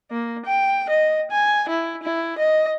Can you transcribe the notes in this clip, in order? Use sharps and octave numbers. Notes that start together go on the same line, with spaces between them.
A#3
G5
D#5
G#5
E4
E4
D#5